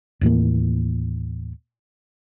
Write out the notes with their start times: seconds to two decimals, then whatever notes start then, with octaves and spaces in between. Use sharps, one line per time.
0.21 D#2 A2 E3 A#3